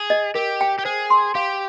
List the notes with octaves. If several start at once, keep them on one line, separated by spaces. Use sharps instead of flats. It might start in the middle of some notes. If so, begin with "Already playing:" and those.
Already playing: G#4
D#5
G4 A#4
G5
G4
G#4 C5
C6
G4 F5